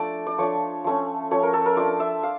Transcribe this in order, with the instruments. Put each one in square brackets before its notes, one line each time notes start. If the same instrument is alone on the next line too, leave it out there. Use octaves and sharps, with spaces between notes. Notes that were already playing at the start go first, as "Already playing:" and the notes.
Already playing: [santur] F3 A3 D4 D5
D5
F3 A3 D4 C#5
F3 A3 C#4
F3 A3 C#4 C#5
A#4
A4
A#4
A3 D4 F4 D5
E5
F5